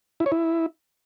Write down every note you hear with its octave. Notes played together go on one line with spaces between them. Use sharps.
E4
C#5
E4